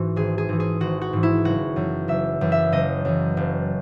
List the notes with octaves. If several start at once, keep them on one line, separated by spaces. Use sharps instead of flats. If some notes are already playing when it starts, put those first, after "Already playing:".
Already playing: G#2 E3 F#4
G#1 G#4
G#4
G#2 E3
G#4
G#1 F#4
F#4
G#2 E3
E4
F#1 F#4
F#2 E3
F#1 E5
F#2 E3
E5
F#1 D#5
F#2 E3
F#1